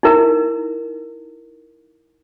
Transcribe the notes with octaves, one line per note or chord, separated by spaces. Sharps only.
D#4 E4 A#4